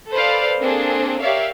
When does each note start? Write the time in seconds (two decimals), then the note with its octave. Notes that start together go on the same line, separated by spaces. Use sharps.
0.12 A4 B4 C5 D5 F5
0.60 A#3 C4 D4 G#4 A4
1.20 G4 A#4 C#5 D5 E5 F5